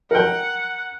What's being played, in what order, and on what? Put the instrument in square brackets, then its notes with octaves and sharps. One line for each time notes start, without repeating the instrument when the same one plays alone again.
[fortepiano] A#4 G5 [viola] F#5